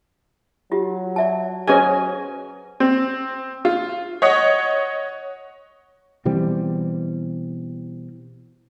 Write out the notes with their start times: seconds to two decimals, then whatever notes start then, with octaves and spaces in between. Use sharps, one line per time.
0.72 F#3 F4 G4
1.16 D5 E5 A5
1.68 F#3 C#4 G#4 B4 C5 D#5 G#5
2.80 C4
3.65 F4
4.22 C#5 D#5 F#5
6.25 B2 E3 G3 C4